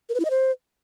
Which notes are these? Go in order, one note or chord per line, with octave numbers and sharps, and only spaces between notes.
A#4
B4
E4
D#5
C5